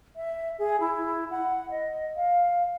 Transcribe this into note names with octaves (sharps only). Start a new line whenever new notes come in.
E5
G#4
E4
F#5
D#5
F5